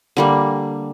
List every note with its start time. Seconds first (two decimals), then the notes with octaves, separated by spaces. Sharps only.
0.17 D3 G3 A#3